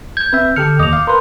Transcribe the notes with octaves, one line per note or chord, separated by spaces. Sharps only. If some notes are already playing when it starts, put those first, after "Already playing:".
G6 G#6
C4 B4 E5
D3 G4 A4 F6 C#7
D#2 D#5 D6 D#6 F7
F5
A#4 B4 C6